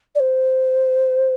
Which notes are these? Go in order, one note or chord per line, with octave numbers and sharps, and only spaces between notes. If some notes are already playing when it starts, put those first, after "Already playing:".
D5
C5